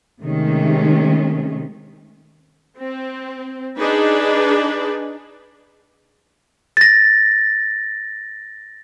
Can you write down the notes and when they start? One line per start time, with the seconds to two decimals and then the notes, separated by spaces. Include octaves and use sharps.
0.21 C3 D#3 G#3 A3 C#4
2.79 C4
3.79 D4 D#4 G#4 B4
6.77 A6 A#6